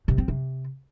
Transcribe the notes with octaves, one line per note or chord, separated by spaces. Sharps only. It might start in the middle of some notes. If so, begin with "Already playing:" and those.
C3
C4
C3